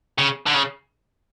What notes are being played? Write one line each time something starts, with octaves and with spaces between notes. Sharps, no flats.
C#3
D3
C#3